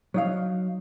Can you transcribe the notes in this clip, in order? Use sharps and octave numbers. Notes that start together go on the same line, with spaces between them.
F#3 D#4 F5